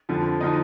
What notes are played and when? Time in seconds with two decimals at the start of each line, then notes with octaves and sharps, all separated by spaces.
0.09 F2 D3 F3
0.40 D3 F3 D#4 D#5